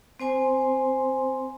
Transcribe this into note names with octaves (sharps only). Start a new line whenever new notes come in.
C4 C5 G#5 C6